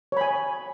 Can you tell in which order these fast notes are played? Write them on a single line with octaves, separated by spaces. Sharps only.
C#5 B5 G#5